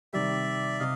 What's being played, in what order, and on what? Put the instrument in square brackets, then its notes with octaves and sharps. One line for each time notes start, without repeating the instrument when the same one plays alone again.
[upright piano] C3 D#3 G3 [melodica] D5 E5
[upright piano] C3 [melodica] D#5 F5